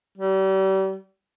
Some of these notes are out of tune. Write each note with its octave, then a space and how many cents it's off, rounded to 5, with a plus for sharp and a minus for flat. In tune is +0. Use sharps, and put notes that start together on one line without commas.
G3 -35